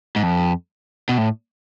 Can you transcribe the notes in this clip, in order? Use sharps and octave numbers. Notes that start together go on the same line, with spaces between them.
G#2
F2
B2
A2